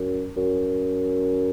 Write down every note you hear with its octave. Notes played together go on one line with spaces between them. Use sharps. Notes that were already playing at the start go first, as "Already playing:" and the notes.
Already playing: F#2
F#2